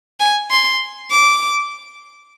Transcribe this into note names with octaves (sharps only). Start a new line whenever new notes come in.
G#5
C6
D6